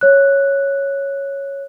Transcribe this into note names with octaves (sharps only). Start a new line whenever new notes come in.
C#5 F#6